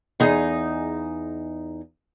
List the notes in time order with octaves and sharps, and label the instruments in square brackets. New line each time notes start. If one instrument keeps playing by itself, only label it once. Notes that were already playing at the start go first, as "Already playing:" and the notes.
[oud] E2 D#4 G#4